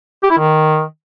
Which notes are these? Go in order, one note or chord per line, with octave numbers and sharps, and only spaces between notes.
G4
E4
D#3